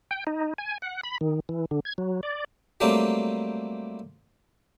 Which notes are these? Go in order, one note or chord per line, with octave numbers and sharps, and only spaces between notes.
G5
D#4
G#5
F#5
B5
D#3
E3
D3
G#6
F#3
D5
F#3 G3 A3 A#3 C4 G4